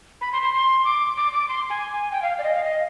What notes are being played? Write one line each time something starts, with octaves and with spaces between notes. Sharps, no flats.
B5
C6
C6
C6
D6
D6
D6
C6
G#5
G5
F5
D5
D#5
F5
D#5